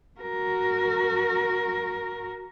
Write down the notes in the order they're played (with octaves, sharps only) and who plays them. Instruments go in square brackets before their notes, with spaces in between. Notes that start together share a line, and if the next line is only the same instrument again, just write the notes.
[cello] F#4 A#4